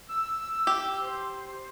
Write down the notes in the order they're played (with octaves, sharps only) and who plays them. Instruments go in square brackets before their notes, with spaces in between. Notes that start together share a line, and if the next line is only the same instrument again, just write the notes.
[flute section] E6
[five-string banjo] G4
[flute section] C5